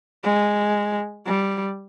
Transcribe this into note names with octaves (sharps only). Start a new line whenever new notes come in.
G#3
G3